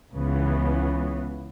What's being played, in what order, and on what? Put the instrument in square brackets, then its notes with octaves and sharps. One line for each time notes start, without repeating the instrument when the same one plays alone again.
[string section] C#2 C#3 E3 B3